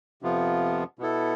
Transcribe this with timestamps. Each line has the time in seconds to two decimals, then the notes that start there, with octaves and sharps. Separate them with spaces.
0.22 F2 C3 F3 B3 F4
0.99 B2 B3 E4 A4